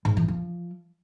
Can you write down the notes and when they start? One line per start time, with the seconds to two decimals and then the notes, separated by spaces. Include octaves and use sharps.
0.05 G#2
0.17 E3
0.28 F3